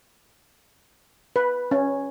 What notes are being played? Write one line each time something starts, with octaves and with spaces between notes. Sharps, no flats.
B4
C#4